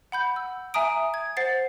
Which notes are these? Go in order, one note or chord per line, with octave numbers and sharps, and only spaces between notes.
F#5 B5 G6
E6
E5 G#5 A#5 D#6 D7
G#6
C5 F#5 A6 C7